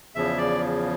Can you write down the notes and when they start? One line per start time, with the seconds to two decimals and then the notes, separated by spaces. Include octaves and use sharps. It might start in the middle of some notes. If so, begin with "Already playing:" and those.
0.15 E2 C#3 F3 E5
0.37 D5